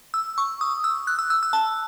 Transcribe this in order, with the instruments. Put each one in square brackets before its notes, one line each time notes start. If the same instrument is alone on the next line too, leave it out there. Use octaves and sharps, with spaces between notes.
[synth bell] E6
C#6
D#6
E6
F#6
E6
E6
E6
A5